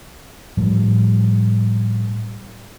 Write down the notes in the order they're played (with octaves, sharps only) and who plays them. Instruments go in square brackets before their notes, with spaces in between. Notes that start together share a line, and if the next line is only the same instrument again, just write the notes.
[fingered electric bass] A2 F3 G3